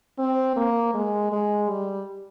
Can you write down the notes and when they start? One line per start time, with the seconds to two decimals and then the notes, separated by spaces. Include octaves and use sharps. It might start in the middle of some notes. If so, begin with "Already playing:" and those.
0.19 C4
0.56 A#3
0.94 G#3
1.32 G#3
1.69 G3